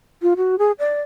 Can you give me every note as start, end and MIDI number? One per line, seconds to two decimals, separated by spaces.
0.22 0.34 65
0.37 0.58 66
0.58 0.72 68
0.79 1.02 74